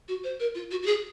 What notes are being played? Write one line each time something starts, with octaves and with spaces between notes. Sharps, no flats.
F#4
C5
A#4
F4
F#4
F#4
G#4